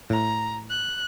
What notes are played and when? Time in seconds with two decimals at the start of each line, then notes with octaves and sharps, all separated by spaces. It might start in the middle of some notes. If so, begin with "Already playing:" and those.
0.10 A2 A#5
0.70 F#6